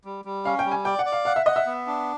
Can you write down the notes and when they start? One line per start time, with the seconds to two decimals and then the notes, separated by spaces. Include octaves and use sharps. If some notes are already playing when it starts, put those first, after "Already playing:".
0.05 G3
0.25 G3
0.45 C#4 F5
0.59 G5
0.65 G3
0.72 G#5
0.85 D5 G5
0.99 F#5
1.06 D5
1.12 F5
1.25 F5 F#5
1.36 E5
1.46 D#5 F#5
1.56 E5
1.66 B3
1.87 D4